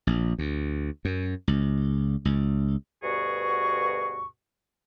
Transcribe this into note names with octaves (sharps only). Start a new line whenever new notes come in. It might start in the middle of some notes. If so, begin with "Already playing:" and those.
A#1
D2
F#2
C#2
C#2
D2 G2 B2 F#4 G#4 C#6